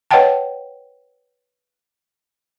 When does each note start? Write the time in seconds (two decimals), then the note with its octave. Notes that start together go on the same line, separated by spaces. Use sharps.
0.11 B4 C#5 D#5 F#5 G5 A5